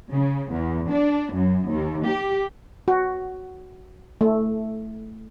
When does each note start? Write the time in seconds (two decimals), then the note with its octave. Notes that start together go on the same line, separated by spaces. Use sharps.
0.10 C#3
0.52 E2
0.89 D4
1.33 F#2
1.70 D#2
2.06 G4
2.88 F#4
4.21 A3